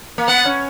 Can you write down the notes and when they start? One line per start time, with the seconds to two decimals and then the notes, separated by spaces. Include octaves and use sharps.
0.18 A#3
0.28 B3 F#5
0.45 C#4